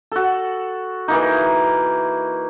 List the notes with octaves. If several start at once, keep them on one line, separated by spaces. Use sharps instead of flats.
F#4 A4
E3 A#3 D#4